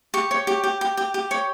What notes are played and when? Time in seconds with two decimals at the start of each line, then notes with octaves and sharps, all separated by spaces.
0.14 G4 C#6
0.31 C#5
0.47 G4
0.64 G4
0.81 G4
0.97 G4
1.14 G4
1.31 C#5